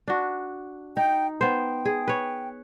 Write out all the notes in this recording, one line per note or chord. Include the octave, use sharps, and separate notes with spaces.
D4 F#4
D#4 G5
B3 C5 G5
G#4
B4 C#5